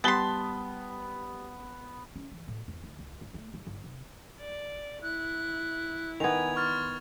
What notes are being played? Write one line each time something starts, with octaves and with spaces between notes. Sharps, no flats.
G3 B3 A5 C6 B6 G7
C#4
E3
A2
E2
D2
C#2
G2
A3
G3
G1
C3
D5
E4 F#6
D#3 B3 G#5 G#6 F7
C6 C#6 F6 A6